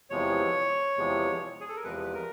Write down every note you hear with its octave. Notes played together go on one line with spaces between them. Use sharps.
E2 C3 F3 G#3 C#5
E2 C3 F3 G#3
G#4
A4
A#4
E2 C3 F3 G#3 B4
A#4